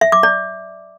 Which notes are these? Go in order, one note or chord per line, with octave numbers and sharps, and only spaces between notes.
E5
D6
D5